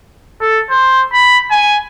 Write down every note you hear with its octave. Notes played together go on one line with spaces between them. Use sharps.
A4
C5
B5
G#5